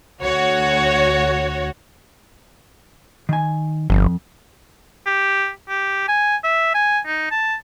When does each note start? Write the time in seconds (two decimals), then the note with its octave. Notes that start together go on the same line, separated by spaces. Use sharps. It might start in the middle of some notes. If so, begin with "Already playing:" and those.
0.22 D2 F#4 C#5
3.29 D#3 G#5
3.90 G1 F2
5.06 G4
5.69 G4
6.08 G#5
6.44 E5
6.75 G#5
7.06 D#4
7.31 A5